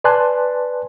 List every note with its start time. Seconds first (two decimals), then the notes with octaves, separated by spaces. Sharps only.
0.04 B4 D5 G#5 A5 C6 F#6